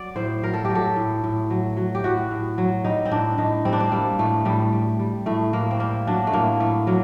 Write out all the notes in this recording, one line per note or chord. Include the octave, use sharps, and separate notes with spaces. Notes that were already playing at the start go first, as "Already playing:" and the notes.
Already playing: F#3 D5
A2 C5
F#3 A#4
A4
G4
F#3
A4
A2
A2
F#3
F#3
G4
A2 F#4
A2
F#3
G3 D#4
C4
A2 D4
A2 D#4
G3 C4
D4
C4
G3 A#3
A2 A3
A2 G3
G3
G3
A2 A3
A2 A#3
C4
G3 A#3
F#3 D4
A3
A2 A#3
A2 A3
F#3 A#3